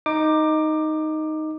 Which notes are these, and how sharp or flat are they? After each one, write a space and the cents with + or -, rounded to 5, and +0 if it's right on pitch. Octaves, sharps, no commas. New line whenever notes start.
D#4 +0 D6 +20